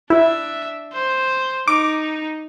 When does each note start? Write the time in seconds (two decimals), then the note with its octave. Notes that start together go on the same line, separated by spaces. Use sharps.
0.10 D4 E4 E5
0.93 C5
1.68 D#4 D6